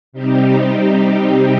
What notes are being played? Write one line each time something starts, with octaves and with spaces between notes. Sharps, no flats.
C3 G3 C4 D#4 G4